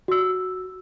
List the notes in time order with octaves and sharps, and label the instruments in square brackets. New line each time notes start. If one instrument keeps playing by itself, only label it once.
[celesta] F#4 E6